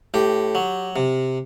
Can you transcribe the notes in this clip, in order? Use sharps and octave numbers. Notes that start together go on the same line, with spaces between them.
A2 G4
F#3
C3